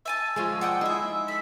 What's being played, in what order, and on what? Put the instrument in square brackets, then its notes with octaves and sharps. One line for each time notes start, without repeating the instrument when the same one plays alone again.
[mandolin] E5 G#5 A5 [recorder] E6
[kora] F3 G#3 [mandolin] C#4 F4 G#4
[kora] D5 [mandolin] F#5 G5 D#6
[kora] G#3 D#4 E4 [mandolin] G#4 E5
[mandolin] A4 [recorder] B6